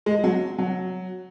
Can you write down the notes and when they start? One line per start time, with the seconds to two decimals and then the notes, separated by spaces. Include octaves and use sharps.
0.06 G#3
0.24 F#3
0.58 F#3